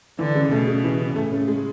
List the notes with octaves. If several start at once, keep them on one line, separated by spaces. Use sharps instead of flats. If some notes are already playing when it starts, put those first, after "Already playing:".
D3 E3
C#3
B2 A3
C#3
E3
C#3
A2 A3
C#3
G#3